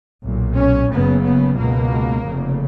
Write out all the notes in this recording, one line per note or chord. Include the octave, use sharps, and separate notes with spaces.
B1 A#2
C#4
F#1 F#2 C#3 B3
B3
C#2 B2 A#3
F1 F2 C#3